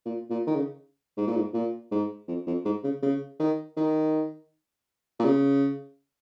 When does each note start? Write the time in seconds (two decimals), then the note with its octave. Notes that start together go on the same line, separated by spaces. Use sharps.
0.05 A#2
0.30 A#2
0.47 D#3
0.55 C#3
1.17 G#2
1.27 A#2
1.36 G#2
1.54 A#2
1.91 G#2
2.28 F2
2.47 F2
2.65 G#2
2.83 C#3
3.03 C#3
3.40 D#3
3.77 D#3
5.19 A#2
5.25 C#3